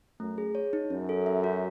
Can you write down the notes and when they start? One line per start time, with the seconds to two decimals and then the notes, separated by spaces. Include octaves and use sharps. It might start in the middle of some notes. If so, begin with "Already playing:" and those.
0.20 F#2 A3
0.38 G#4
0.55 C#5
0.73 D#4
0.90 F#2 C#4
1.09 A4
1.26 E5
1.44 F#4